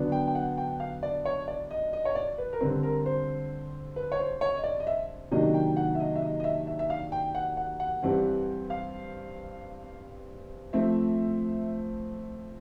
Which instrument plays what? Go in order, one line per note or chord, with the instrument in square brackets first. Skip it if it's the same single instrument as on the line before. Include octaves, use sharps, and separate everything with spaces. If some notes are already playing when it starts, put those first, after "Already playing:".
Already playing: [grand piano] D3 F#3 B3 D4
G5
G5
F#5
G5
F5
D5
C#5
D5
D#5
D#5
C#5
D5
B4
A#4
D3 G3 C4 B4
A#4
C5
B4
C#5
C5
C#5
D#5
D5
D#5
E5
C3 D#3 F#3 A#3 D4 D#5
G5
F#5
E5
D#5
E5
D#5
D#5
E5
E5
E5
F5
G5
F#5
F#5
F#5
G2 E3 G3 C4
F5
F3 A3 C4 E5